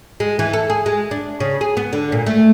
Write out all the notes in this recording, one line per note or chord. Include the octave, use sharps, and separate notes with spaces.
G#3
E3
A4
G#4
G#3
D4
C#3
G#4
B3
D3
A#2
A3